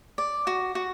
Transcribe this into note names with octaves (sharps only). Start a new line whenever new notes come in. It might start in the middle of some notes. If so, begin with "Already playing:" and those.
D5
F#4
F#4